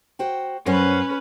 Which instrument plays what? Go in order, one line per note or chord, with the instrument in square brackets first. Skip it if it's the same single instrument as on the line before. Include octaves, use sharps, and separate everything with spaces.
[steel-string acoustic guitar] F#4 C5 G5
[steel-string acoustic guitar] F#2 C5 [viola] C#4 B4